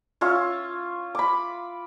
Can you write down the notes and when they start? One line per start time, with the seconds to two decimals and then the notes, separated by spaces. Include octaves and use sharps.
0.21 C#4 F4 E5 C#6
1.15 B5 D6